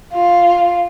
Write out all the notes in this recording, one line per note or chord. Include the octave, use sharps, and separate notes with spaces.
F4